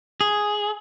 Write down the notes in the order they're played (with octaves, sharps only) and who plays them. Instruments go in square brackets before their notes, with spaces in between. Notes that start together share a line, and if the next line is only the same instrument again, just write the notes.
[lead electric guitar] G#4